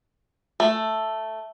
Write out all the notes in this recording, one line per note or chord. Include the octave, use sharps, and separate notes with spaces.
A3